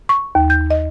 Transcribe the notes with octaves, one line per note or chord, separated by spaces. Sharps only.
C#6
D#2
G6
D#5